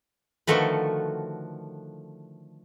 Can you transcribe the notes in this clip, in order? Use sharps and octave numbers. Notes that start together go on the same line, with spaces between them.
D3 D#3 F3 A3 F#4 B4